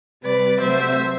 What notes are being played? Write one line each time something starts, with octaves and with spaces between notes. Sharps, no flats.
C3 G3 B4 D5
C3 F#3 A3 C5 E5